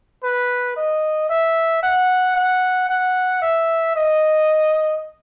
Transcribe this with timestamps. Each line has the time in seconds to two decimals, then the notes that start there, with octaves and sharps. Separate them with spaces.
0.23 B4
0.76 D#5
1.29 E5
1.83 F#5
2.36 F#5
2.89 F#5
3.42 E5
3.96 D#5